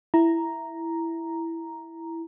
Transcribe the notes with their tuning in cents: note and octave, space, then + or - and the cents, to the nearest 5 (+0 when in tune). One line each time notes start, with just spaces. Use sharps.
E4 +0 A#5 +0